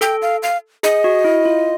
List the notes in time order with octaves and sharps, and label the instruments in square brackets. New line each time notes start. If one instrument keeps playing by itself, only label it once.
[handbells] A4 [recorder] G5
[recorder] F5
F5
[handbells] G#4 [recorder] D#5
[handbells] F#4
E4
F4